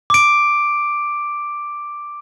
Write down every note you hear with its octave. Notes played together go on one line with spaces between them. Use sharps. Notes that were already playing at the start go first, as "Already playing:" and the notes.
D6 D7